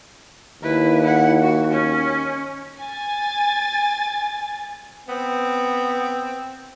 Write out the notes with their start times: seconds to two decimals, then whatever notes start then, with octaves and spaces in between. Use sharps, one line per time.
0.62 D#2 E4 B4
1.03 E4 F#5
1.42 F#4
1.72 C#4
2.80 G#5 A6
5.09 B3 C4